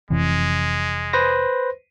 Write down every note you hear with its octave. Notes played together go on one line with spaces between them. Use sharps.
F1 C3 E3 G#3
B4 C5 A#6